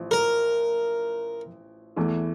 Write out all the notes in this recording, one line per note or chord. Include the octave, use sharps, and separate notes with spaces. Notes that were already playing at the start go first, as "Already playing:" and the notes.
Already playing: A1 F3
A#4
E2 E3 A3